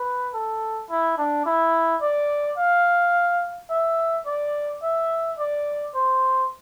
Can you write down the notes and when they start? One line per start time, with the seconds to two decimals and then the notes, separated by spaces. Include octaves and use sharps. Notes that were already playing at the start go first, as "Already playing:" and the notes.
Already playing: B4
0.34 A4
0.90 E4
1.18 D4
1.46 E4
2.02 D5
2.58 F5
3.70 E5
4.27 D5
4.82 E5
5.38 D5
5.95 C5